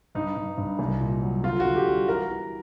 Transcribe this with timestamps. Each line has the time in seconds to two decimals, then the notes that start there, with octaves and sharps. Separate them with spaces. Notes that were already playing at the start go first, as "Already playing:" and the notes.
0.15 G2 D#4
0.36 G2
0.57 G2
0.79 C2
1.00 A#2
1.22 F#3
1.43 D3 F4
1.60 F#4
1.65 D3
1.76 G4
1.86 G3
2.08 E3 A#4
2.30 E3